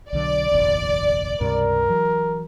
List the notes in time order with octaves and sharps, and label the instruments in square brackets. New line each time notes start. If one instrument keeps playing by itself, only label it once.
[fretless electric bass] B1 D3 F#3 [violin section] D5
[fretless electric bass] F1 A#1 D#2
[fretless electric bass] C#2 G2 C3 [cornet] A#4
[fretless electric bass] E3 F#3